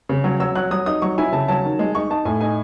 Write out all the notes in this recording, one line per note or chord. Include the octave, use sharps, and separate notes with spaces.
C#3
F#3
F#3 E6
F#3 F#6
F#3 D#6
D#4 D#6
F#3 C#6
E4 G#5
C#3 A5
F#3 A5
D#3
G#3
D#4 C#6
D#4 A5
A2 G#5
D#4 G#5